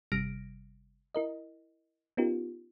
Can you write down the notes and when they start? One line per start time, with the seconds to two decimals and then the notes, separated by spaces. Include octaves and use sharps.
0.12 G1 C3 G3 F6 A#6 D7
1.15 E4 A#4 D#5
2.17 B3 C#4 D#4 F4 G4 A#4